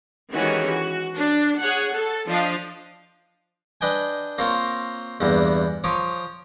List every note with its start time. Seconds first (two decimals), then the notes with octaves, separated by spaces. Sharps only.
0.32 D#3 E3 G#3 C#4 F#4 G4
0.69 F#4
1.18 D4
1.59 G#4 C#5 F#5
1.93 A4
2.27 F3 D4 D#5 F5
3.81 D4 B4 D#5 G5 G#5
4.38 A#3 C4 F4 A#4 C#5 F5
5.21 E2 G2 A#3 B3
5.84 F3 C#5 A#5 D6 D#6